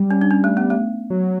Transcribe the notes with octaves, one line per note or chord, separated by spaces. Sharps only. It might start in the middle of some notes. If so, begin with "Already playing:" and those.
Already playing: G3
C#4
D4
C#4
A3
B3
A3
F#3